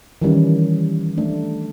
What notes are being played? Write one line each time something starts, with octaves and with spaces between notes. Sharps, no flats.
D#3 E3 G3 C#4
A3 D4